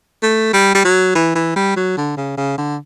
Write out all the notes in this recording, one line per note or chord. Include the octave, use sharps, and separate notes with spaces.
A3
G3
G3
F#3
E3
E3
G3
F#3
D3
C#3
C#3
D3